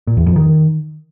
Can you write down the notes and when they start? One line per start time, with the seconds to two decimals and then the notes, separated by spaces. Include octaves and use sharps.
0.07 A#2
0.17 E2
0.26 F2
0.36 D#3